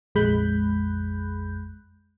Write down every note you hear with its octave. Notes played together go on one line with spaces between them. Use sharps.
A#1 F2 G#3 B5 F#6 G6